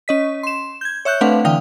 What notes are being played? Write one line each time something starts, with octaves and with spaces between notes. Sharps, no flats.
C#4 D#5 B6
C6 E7
G6 G#6
C#5 E5 C#6 F#6 G6
A3 C4 D4 B4 F5 F#5
D3 E3 F5 G5 D#6